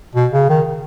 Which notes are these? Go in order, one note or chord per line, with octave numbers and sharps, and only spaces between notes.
B2
C#3
D#3